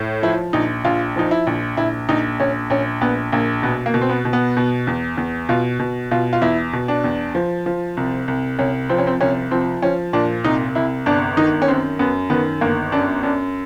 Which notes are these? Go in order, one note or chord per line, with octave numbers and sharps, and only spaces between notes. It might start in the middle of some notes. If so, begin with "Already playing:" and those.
Already playing: A2
F3 E4
A#1 D#4
A#1 F4
F3 D#4
E4
A#1
A#1 E4
A#1 D#4
A#1 C#4
A#1 C#4
A#1 B3
A#1 A#3
B2 B3
A#3
B2
C4
B3
B2
B3
B2
E2
E2
B2 F4
B2
B2 F4
F4
E2 E4
B2
D4
E2
F3
F3
C2
C2
C2 C#4
F3 C4
C#4
C4
C2 C#4
F3 C4
F3 C#4
A#2 D4
C2 D#4
C2 E4
G1 D4
D#3 D#4
C#4
F#2 C4
F#2 B3
D#3 B3
G1 A#3
F#2 D4
F#2 D4